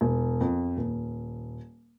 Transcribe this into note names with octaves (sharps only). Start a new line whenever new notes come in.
E1
F2
D#1